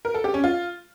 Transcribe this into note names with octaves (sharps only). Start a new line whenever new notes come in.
A#4
A4
G4
C#4
F4